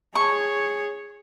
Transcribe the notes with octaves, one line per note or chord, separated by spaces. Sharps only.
G#4 C#5 C#6